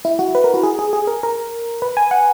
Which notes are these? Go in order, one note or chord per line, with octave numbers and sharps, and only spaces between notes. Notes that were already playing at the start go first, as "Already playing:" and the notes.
E4
F#4
B4
A#4
F#4
G#4
G#4
G#4
A#4
A#4
B4
G#5
F#5